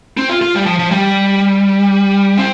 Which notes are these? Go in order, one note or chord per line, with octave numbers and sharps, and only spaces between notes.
C4
F4
F4
G3
F3
F3
G3
C4